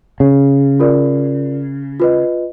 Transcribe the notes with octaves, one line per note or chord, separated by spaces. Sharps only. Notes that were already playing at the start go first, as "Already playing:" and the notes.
C#3
F4 A#4 D5
F4 B4 D#5